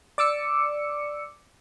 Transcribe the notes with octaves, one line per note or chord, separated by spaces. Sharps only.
D5 D6 E6 C#7